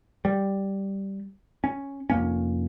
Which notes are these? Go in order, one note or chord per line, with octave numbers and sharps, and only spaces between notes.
G3
C#4
F1 A#3 C#4